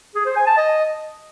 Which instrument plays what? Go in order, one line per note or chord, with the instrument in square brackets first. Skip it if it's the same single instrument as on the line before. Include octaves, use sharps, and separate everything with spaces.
[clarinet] G#4
C5
G#5
A5
D#5